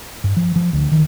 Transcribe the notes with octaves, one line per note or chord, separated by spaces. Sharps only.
G2
F3
F3
D2
D#3